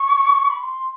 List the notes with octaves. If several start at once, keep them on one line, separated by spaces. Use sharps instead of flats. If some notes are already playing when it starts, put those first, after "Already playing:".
Already playing: C#6
B5
C6